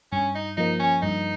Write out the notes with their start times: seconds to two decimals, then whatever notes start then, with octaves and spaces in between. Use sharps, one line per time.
0.12 G2 C#4
0.35 D#4
0.57 F3 A#3 D#4
0.80 C#4
1.02 G2 D#4